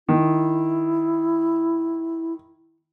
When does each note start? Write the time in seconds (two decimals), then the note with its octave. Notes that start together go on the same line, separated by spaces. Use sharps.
0.09 D#3 E4